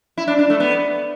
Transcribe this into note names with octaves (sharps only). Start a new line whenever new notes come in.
E4
D4
D4
A3
B3